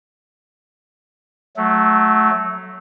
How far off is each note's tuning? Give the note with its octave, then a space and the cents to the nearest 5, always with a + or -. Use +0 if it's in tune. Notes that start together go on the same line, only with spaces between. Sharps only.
F#3 +0 A3 -15